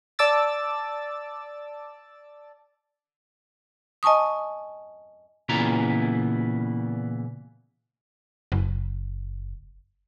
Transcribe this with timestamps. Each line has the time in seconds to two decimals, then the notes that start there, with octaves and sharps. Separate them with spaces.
0.19 D5 A5 D6 E6 A6
4.03 D#5 G#5 A5 C#6 D#6
5.49 A#2 C#3 E3 B3 E4 A#5
8.52 F#1